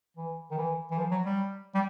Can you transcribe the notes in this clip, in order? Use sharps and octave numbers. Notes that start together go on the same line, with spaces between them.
E3
D#3
E3
E3
F3
F#3
G3
G3